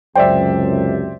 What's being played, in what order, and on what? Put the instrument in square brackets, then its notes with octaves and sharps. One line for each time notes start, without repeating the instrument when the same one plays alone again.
[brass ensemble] C#2 F#2 C3 [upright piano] C5 D5 E5 [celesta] G5